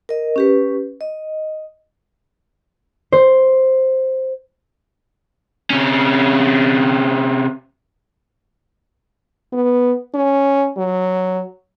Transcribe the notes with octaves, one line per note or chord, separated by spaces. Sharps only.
A#4 D#5
C#4 G4 B4
D#5
C5
C3 C#4
B3
C#4
F#3